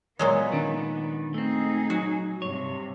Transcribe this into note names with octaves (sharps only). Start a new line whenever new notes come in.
A#2 F#3 G#3 A#3 B3
D#3 D4 D#4
A3 C4 D#4 G#4
F#3 F#4
G2 C3 C#5